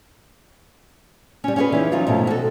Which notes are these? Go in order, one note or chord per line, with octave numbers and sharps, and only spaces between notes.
G3 C#4
C#4 F4 F#4 G#4 B4
E3 C#4 D#4
F3 F#3 D#4 F4
G#2 B2 D#3 F3 A3
F#4 A4